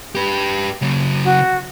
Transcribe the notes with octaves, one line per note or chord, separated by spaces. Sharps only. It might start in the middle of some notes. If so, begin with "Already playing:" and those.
G4 B4
C#3 F#3
F#4